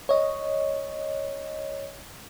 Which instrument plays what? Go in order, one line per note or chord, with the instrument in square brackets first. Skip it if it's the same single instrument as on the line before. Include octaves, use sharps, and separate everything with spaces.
[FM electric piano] C#5 D#5